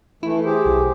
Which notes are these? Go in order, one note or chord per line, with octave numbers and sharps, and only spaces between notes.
E3 A3 E4
G4 G#4 C5
B1